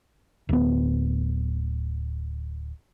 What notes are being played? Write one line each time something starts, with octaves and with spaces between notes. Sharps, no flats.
D1 B3